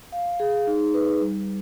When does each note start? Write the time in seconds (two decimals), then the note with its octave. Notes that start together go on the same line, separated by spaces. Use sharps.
0.12 F5
0.40 G#4
0.67 D#4
0.94 B4
1.21 G3